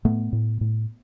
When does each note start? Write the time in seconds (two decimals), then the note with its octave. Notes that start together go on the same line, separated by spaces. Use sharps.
0.05 A2 A3 B3
0.33 A2
0.61 A2